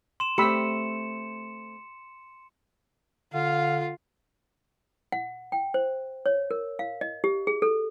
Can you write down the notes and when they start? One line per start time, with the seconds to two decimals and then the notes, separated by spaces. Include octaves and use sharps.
0.20 C6 E7
0.38 A3 C4 G4 B5 E6 C#7
3.34 D3 F4 F5
5.12 F#5
5.52 G5
5.74 C5
6.26 C#5
6.51 A#4
6.79 F5
7.01 D#5
7.24 G4
7.47 G#4
7.62 A4